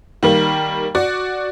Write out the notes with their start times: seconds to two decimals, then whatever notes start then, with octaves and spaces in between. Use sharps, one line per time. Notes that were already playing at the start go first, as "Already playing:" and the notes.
0.23 D#3 G3 A#3
0.95 F#4 D5